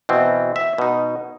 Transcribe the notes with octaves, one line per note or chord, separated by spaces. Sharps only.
B2 E3 C4
E5
B2 D#4